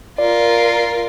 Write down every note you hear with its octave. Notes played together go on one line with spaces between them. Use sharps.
F4 A#4 D5